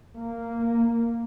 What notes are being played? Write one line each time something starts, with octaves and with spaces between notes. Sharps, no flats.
A#3